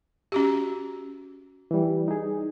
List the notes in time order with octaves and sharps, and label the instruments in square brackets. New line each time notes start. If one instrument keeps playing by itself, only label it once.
[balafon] C#4 F#4 G4
[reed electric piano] E3 G3
D#4 G#4